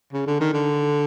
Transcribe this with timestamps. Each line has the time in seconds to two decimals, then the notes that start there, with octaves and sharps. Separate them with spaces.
0.13 C#3
0.27 D3
0.40 D#3
0.54 D3